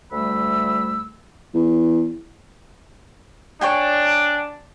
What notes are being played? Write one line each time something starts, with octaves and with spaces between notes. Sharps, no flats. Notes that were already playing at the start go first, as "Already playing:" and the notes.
D2 G3 A3 B5 E6
E2
D4 C#5 G5 G#5